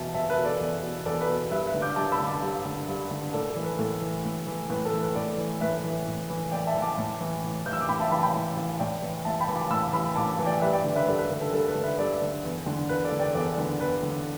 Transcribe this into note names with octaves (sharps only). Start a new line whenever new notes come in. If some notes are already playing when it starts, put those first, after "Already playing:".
Already playing: E2 B2 E5 A5
E2 E5 A5
B4 E5
B2
A4 D5
E2
B2
E2 A4 D5
B4
B2
G2 B4 E5
B4 E5
D3
D6 G6
G2 A5 D6
B5 E6
D3
A5 D6
G2
D3
G2
D3
A2 A4 D5
A4
E3
B4
A2 A4
E3
A2
E3
A2 B4
A4
E3
B4
A2 A4 D5
E3
A2 B4 E5
E3
A2
E3
A2 D5 G5
E5 A5
E3
A5 D6
A2
E3
A2
E3 G6
E6
D6
A2 G5 B5
E5 A5
E3 G5 B5
G5 B5
A2
E3
A2 D5 G5
E3
A2 E5 A5
G5 B5
E3
A5 D6
A2 B5 E6
E3 B5 E6
B5
A2 A5 D6
E3
D5 G5
G2 B4 E5
D5 G5
D3
B4 E5
G2 A4 D5
B4
D3 A4
A4
G2 A4
B4
D3
B4 E5
G2 A4 D5
D3
E2
D3
E2 B4
A4 D5
D3
D5 G5
E2 A4 D5
D3 B4
E2 B4
D3